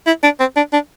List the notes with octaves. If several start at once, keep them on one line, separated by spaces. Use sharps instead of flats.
E4
D4
C4
D4
D4